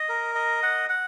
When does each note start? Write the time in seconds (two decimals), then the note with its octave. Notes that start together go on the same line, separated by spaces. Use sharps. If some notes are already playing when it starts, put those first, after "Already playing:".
Already playing: D#5
0.09 A#4
0.35 D#5
0.63 F#5
0.89 F#5